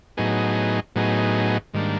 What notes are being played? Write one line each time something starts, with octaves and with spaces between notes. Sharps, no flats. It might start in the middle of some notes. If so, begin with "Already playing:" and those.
A2 F#3 B3 D#4 G#4
A2 F#3 B3 D#4 G#4
G#2 D#3 G3 A#3 D4